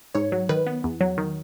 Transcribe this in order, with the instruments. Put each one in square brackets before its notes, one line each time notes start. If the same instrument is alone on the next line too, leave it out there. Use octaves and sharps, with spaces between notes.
[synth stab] G#2 C#5
F#3
D#3 B4
B3
E2
F#3
D#3